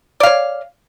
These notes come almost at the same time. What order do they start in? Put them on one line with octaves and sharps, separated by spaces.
D5 F5 C#5